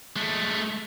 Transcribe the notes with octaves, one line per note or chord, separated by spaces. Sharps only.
G#3 A3